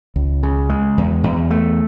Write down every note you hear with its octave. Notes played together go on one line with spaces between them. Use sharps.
C#2
C#3
G#3
E2
E2
A3